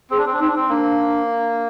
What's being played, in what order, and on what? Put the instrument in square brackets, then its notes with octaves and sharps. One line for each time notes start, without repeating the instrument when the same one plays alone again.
[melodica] C4 [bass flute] G#4
[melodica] D4
C4
D4
[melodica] C4 [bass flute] D#4
[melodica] D4
C4
[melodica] A#3 [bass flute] D4